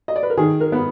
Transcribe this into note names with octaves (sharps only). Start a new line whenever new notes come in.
D#5
D5
B4
A#4
D#3 G#4
A#4
B3